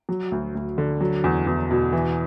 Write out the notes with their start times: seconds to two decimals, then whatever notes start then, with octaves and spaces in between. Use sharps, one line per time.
0.09 F#3
0.32 D2
0.55 D2
0.78 D3
1.01 F#3
1.24 E2
1.47 E2
1.71 B2
1.93 E3